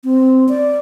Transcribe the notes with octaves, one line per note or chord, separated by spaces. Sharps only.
C4
D5